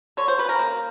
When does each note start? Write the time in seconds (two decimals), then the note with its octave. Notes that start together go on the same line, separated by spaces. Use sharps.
0.17 D3 C#5
0.28 C5
0.38 C#4 B4
0.49 A#4
0.59 A#3